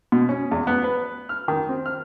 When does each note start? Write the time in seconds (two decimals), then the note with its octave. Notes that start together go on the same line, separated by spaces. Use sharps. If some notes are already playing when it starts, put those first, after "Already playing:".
0.12 B2
0.29 C#4
0.51 E2
0.67 B3
0.84 B4
1.29 F6
1.48 D#3
1.69 C4
1.86 F6